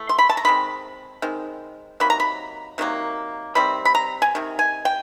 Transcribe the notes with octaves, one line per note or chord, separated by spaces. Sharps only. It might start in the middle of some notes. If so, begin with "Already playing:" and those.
Already playing: E3 A3
C6
B5
A5
A#5
D#3 G#3 C4 B5
D#3 G#3 C4
C3 D#3 F#3 A#3 B5
A#5
B5
C3 D#3 F#3 A#3
C3 D#3 G3 C4 B5
B5
A#5
G#5
C3 D#3
G#5
G5